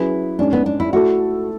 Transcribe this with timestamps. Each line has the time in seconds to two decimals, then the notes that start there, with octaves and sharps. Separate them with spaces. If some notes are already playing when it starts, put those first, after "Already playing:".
Already playing: F#3 C#4 E4 G#4 B4
0.38 G#2 G#3 C#4 D4
0.53 B3
0.66 D4
0.80 E4
0.93 A3 E4 F#4 A4